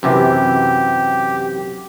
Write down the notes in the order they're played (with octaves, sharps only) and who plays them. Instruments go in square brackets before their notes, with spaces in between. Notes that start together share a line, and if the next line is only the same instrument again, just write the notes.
[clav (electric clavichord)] F#2 C3 E3 [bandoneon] G4